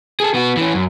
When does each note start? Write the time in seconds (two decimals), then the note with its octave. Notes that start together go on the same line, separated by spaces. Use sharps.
0.20 G#4 A4
0.34 B3 F#4
0.57 E3 C#4
0.74 F#2